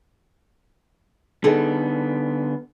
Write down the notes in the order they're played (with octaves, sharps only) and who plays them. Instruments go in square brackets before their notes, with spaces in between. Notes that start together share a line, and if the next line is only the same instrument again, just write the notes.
[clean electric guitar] D3 B3 [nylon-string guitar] D#4 G#4 A4